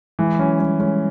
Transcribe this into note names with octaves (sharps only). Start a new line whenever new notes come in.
E3 G#3
F#3 C#4
G3 C#4
G#3 C#4